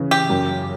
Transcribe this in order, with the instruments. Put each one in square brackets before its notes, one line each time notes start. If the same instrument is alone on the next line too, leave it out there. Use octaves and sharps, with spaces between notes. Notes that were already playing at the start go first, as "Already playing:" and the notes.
Already playing: [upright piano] C#3 E3
[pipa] G4
[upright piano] F#2